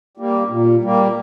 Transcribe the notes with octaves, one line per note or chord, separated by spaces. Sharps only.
G3 A#3
A#2
G3 A#3